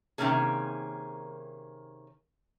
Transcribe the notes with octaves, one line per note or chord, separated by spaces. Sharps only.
C3 D#3 F3 A#3 C#4 G#4